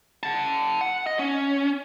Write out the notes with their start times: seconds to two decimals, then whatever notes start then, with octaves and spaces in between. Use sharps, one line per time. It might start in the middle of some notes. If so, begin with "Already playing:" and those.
0.23 F#5 A5
0.81 F#5
1.07 D#5
1.19 C#4